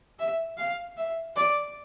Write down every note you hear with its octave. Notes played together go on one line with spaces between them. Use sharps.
E5
F5
E5
D5